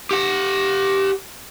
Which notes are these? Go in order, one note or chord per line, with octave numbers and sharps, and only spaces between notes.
G4 F#5